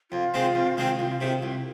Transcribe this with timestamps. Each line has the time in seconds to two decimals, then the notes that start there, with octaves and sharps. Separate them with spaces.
0.11 F2 F4
0.34 D#3 G#3 C4
0.55 F2
0.77 D#3 G#3 C4
0.99 C2 F4
1.10 F4
1.21 C3 D#3 G#4
1.32 F4
1.43 C2